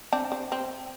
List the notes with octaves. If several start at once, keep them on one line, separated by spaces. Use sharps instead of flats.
C4 D4
C4
C4